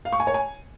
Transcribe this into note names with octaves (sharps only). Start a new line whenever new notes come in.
F5
C#6
G#5
C#5
G#5